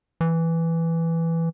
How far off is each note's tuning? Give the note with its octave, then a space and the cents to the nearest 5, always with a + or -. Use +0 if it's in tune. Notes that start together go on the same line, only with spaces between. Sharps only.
E3 +5